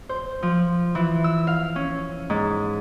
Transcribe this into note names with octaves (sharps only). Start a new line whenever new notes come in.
C5
F3
E3
E6
F5
C#4
G#2